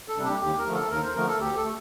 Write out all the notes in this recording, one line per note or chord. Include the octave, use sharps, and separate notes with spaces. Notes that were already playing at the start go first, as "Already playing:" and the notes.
A4
C3 G3 D4
G4
D#2 G4
A#4
D3 F3 A3
A4
D#2 A#4
C5
D3 F3 A3 A#4
A4
D2 G4
A4
A3